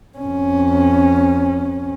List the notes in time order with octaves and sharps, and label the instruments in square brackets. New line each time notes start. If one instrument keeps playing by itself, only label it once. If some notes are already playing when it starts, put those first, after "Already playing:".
[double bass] F2 C#4